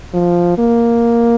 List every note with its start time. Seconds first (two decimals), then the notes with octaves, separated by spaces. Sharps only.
0.14 F3
0.58 A#3